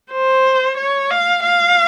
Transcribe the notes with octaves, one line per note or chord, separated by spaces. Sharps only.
C5
C#5
F5
F5